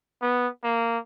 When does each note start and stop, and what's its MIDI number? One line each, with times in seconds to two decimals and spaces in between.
0.22 0.48 59
0.64 0.98 58